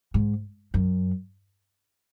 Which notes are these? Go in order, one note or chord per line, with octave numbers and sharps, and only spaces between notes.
G#2
F#2